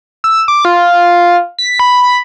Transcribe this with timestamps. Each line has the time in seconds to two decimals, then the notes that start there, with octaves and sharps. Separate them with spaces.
0.24 E6
0.48 D6
0.65 F4
1.59 B6
1.79 B5